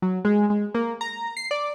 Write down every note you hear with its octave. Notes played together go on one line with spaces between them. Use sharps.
F#3
G#3
G#3
A#3
A#5
C7
D5